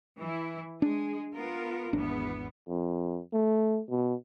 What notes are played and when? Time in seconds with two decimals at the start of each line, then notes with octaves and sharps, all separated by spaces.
0.18 E3 E4
0.82 G#3 D4 G#4
1.33 B3 F4 A#4
1.93 G#1 E2 B3 D4
2.68 F2
3.33 A3
3.90 B2